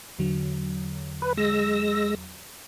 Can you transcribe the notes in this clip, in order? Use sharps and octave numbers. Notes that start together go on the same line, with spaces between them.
E2 D3 F#3
B4
G#3 E6 A#6